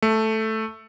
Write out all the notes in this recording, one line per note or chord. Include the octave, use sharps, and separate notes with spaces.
A3